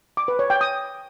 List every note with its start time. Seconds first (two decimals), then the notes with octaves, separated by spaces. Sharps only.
0.17 D6
0.28 B4
0.39 C#5
0.50 G5
0.61 D#6